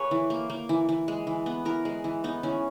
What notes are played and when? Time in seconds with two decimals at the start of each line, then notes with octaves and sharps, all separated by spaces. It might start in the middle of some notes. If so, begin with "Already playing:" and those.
Already playing: A#3 G#4 B4 C#5
0.11 E3
0.30 A#3
0.50 A#3
0.69 E3
0.89 E3
1.08 G#3
1.27 E3
1.46 B3
1.65 E3 A#4
1.85 G#3
2.04 E3
2.24 B3 D#4
2.43 E3 C#4